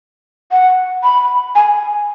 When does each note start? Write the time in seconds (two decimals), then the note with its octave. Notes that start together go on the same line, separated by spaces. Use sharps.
0.51 F#5
1.03 B5
1.55 G#5